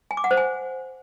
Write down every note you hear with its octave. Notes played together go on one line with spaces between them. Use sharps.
G#5
D6
F#5
C5
G#5